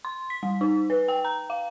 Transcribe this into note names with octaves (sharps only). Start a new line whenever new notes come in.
C6
B6
G3
D#4
B4
G5
A#5
F5